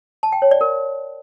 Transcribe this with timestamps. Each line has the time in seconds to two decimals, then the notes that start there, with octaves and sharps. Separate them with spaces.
0.23 A5
0.32 G5
0.42 C#5
0.51 D5
0.61 A#4